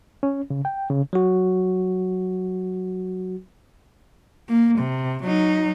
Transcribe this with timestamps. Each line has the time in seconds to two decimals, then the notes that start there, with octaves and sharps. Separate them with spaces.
0.23 C#4
0.50 C#3
0.65 G5
0.90 C#3
1.13 F#3 F#4
4.49 A#3
4.78 C3
5.23 F#3 D#4